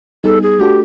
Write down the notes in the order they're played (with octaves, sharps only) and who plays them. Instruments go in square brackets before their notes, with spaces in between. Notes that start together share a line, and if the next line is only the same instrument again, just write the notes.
[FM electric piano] G3 B3 D#4 G#4 [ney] A4
[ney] G#4
[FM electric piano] A3 D4 F#4 A4 [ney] G4